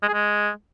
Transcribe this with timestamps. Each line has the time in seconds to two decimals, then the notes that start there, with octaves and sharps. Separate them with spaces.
0.03 G#3
0.08 G#4
0.14 G#3